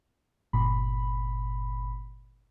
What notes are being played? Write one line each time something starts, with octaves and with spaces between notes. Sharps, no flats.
G1 A#2 B5